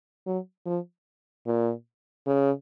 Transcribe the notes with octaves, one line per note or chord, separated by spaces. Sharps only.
F#3
F3
A#2
C#3